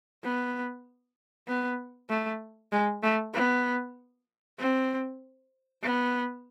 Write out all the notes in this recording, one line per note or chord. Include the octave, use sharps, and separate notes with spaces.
B3
B3
A3
G#3
A3
B3
C4
B3